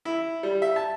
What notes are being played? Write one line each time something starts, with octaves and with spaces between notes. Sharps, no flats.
E4
G3
E5
A5